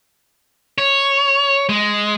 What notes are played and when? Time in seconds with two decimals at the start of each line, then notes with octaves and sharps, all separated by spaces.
0.78 C#5
1.69 G#3